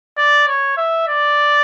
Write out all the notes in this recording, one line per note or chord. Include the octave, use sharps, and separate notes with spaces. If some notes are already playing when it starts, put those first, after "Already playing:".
D5
C#5
E5
D5